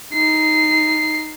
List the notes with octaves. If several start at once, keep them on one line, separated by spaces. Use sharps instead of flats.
D#4 C7